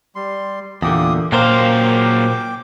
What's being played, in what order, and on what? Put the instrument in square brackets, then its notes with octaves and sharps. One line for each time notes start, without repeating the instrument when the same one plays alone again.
[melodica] G3 C6
[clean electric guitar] E2 A#2 D3 [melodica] A#3 G4 D#6
[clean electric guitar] A#2 A#4 C5 [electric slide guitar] F#3 A#3 F5 [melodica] G5 D6